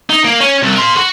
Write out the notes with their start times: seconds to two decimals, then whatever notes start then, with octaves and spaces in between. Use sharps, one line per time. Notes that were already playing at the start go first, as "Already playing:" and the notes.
0.10 D#4
0.25 A#3
0.41 C#4
0.63 C2
0.75 A#4 C6
0.97 F#4